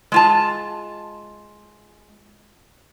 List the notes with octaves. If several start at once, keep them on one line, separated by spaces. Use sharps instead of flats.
G#3 F4 A5